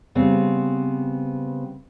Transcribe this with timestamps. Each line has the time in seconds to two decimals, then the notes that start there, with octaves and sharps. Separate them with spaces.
0.15 C#3 G3 B3 C4